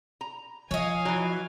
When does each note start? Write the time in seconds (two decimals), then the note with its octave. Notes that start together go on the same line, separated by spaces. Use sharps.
0.21 A#5
0.71 F3 C#5 D#5 F5 G#5
1.05 E3 F#3